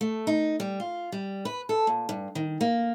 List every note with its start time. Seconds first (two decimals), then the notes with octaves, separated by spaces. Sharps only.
0.01 A3
0.27 D#4
0.60 G3
0.80 F4
1.12 G3
1.45 B4
1.69 A4
1.87 A#2
2.09 G2
2.35 D#3
2.61 A#3